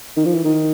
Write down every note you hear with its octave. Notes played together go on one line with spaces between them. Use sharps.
D#3
F3
E3
D#3